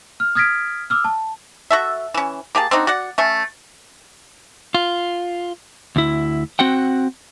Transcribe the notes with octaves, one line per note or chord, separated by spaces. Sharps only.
F6
D#6 F6 G#6 A#6 B6 D7
D6 E6 F6
A5
F#4 A4 E5
E3 C#4
A#3 G4 G#4 A5
C4 D4 D#4 F#4
F#4 D5 F#5
A3 C#4
F4
D2 E4
C4 F#4 F#5 G5